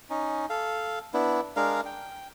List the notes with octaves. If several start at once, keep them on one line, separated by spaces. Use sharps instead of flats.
C#4 D#4
A4 F5
B3 D4 E4
G#3 D4 A#4 F5
G5